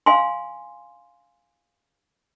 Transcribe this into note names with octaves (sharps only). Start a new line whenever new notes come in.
F5 G#5 C6